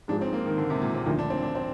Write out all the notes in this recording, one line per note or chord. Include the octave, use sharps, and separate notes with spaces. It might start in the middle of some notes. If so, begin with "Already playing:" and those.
G#2 F3 G#3 D4
C4
A#3
D#3
D3
C3
A#2
C3
D2 D3 D#3 F3
D4
C4
D4
C4